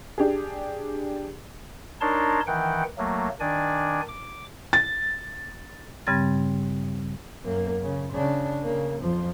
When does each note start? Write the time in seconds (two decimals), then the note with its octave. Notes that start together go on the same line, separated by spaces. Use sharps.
0.18 D4 G4 G#4
2.01 D4 D#4 A#4 C#5 A5 C6
2.47 D#3 E3 F#5 G5
2.98 F#3 A3 A#3
3.40 D#3 D4 D5 G#5
4.08 D6
4.73 A6
6.07 G2 C#3 G3 C4 G#6 A6
7.43 F#2 A#3
7.82 C#3
8.12 C#3 D4
8.64 C#3 A#3
9.01 F2 F3